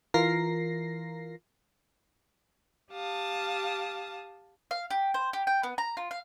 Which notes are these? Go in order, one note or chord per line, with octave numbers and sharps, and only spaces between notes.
E3 F4 A#4 A#6 C7
G4 F5 A5 D#6
F5
G4
C5
G4
G5
B3
A#5
F4
F5